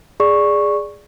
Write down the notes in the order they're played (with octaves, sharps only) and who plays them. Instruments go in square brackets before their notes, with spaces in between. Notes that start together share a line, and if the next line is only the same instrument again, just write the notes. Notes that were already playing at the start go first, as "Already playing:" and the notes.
[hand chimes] G#4 D5 C#6